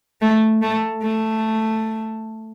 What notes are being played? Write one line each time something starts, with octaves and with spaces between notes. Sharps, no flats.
A3
A3
A3